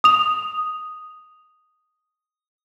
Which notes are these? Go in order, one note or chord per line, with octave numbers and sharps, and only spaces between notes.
D#6 F7